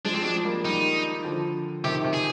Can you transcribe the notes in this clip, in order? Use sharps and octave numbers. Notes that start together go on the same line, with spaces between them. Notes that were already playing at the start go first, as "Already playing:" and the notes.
F3 G#3 D4
C4
F3 G#3 D4
G3 A#3
D#3 G3 D#4
D3 F3
C3 D#3 G4
C3
G#4